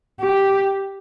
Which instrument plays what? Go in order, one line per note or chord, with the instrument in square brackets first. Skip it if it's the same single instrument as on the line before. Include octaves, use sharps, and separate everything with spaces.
[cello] G4